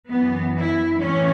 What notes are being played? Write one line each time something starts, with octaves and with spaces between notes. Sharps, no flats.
F#2 E3 B3
E4
A2 E3 C#4